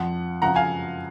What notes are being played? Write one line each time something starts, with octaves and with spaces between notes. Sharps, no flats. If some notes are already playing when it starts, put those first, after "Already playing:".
Already playing: F2 F3 F#5
F#2 C#3 F3 F#5 A#5
F5 G#5